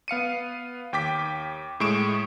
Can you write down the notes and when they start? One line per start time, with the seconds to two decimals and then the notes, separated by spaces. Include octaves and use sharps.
0.08 B3 F5 C#7 D#7
0.93 D#2 G5 D6 B6
1.80 A2 G#3 C#6 D7 E7